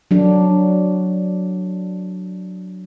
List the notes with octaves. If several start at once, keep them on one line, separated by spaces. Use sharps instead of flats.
F#3 D4